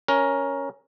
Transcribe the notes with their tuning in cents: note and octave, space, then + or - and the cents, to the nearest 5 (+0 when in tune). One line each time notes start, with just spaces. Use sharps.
C#4 +0 A#4 +10